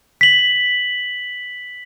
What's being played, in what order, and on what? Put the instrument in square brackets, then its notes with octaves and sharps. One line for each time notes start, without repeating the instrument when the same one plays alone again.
[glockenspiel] B6 F#7